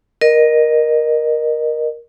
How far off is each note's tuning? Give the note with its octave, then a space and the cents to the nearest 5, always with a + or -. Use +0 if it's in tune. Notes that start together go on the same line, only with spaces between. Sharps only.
A#4 +10 D#5 -20